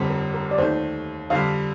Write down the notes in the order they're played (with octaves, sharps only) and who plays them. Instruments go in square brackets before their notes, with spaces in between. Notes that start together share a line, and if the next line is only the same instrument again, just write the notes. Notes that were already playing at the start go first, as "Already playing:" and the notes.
Already playing: [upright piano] G1 F2 D3 G3 C4
[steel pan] A#4
A#4
D5
[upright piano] D#2 D#3 A3 [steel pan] C5
[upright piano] F2 D3 G3 [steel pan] F5